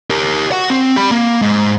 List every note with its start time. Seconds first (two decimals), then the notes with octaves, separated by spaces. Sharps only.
0.10 G4 A#4
0.52 F#4 F#5
0.70 C4
0.96 G4 B5
1.11 A#3
1.42 G#2